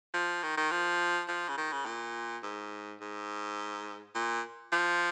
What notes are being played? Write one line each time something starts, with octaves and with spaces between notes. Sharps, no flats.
F3
D#3
D#3
F3
F3
C#3
D#3
C#3
A#2
G#2
G#2
A#2
F3